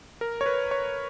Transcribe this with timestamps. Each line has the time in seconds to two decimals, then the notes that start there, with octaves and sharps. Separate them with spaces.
0.21 A#4
0.41 C#5
0.46 B4
0.71 C#5